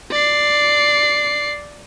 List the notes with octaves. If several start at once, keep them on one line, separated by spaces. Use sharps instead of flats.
D5 C7